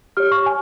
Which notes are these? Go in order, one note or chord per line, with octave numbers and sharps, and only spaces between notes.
G4 C#5 F6
C#6
G#5